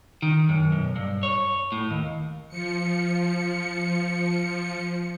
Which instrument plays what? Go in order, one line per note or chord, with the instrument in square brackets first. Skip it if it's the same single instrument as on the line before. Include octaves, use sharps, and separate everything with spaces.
[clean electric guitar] D#3
F#2
B1
G2
C#5
A2
D#2
[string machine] F3 C#7